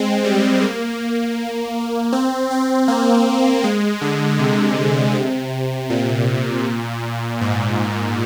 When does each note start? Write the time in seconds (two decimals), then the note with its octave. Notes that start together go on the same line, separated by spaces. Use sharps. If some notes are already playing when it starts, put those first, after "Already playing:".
Already playing: G#3 C4
0.24 G3
0.62 A#3
2.13 C4
2.51 C4
2.88 A#3
3.64 G#3
4.01 D3
4.39 C3
5.15 C3
5.90 A#2
7.41 G#2